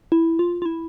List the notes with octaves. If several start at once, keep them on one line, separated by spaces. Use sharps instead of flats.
E4
F4
F4
E4